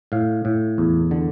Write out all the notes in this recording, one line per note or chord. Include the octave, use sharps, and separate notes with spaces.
A2 F5
A2
E2
D3